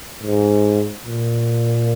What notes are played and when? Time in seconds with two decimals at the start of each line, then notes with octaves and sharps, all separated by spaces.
0.23 G#2
1.06 A#2